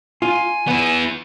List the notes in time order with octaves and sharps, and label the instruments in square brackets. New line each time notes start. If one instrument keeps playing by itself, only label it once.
[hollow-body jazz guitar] F4 [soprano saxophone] G#5
[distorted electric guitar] B3 E4